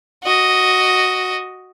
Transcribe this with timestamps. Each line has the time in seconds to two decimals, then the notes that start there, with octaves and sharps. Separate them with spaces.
0.24 F#4 D#5